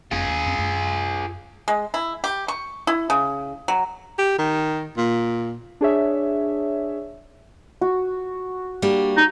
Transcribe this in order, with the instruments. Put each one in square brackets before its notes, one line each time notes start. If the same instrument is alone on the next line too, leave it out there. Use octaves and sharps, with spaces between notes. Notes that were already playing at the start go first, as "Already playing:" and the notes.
[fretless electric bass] F#1 F2 B3 [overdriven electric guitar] F4 G#4
[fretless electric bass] D#2 A#3
F2 C4
F#2 A3 D4
[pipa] G#3
E4
G4
C#6
E4
C#3
F#3
[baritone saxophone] G4
D#3
A#2
[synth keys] D4 G#4 C#5 E5
[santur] F#4
[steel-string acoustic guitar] G3 A#3 D4
[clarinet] D#4